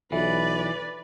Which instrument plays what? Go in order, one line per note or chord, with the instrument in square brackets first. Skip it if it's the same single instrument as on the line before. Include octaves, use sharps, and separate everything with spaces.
[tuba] B1 [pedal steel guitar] E3 [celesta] F4 A4 E5 [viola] B4 D5